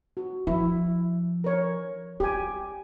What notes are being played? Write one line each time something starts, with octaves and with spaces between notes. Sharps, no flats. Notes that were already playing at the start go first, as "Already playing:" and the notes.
F#4
F3 E4
A#4 C#5
G3 G4 G#5